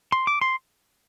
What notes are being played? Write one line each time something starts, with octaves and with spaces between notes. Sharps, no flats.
C6
D6
C6